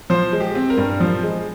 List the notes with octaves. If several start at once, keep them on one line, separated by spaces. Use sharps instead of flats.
F3 C5
G#3
G4
C4
A#4
G2
F3 C5
G#3